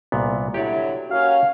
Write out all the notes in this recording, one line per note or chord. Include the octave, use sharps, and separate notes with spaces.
C2 A#2 B3
D3 F#3 E4 G4 C#5 D5
A#3 C#4 F#4 F5